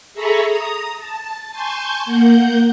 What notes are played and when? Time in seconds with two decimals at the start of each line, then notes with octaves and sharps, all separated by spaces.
0.14 G#4 A4 E5 A#5 B5 C#6
0.46 A#5 D#6
0.98 A5
1.51 G#5 A5 C6 C#6 G6
2.06 A#3 F#5 G6